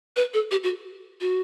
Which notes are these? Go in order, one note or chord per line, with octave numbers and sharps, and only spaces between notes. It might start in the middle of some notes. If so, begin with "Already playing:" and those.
B4
A4
G4
F#4
F#4